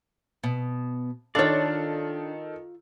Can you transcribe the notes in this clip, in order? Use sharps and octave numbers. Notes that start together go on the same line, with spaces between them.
B2
D#3 D4 F4 A4 C#5 D5